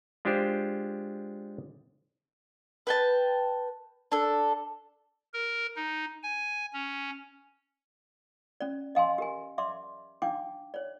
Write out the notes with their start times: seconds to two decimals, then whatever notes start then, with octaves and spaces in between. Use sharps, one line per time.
0.25 G#3 D4 F4 G4 C5
2.87 B4 G5 A5
4.12 D4 A4
5.34 A#4
5.76 D#4
6.23 G#5
6.73 C#4
8.61 C#4 D5
8.95 D#5 F5 G#5 C6
9.18 G4 A#4 G#5
9.58 D5 E5 C6 D6
10.22 D4 D#4 F5 G5 D6
10.74 C#5 D5